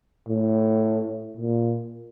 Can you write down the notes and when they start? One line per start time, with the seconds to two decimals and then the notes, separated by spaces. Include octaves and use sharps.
0.28 A2
1.37 A#2